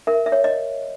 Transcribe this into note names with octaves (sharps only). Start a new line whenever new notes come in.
A#4 E5
E5
C#5
D#5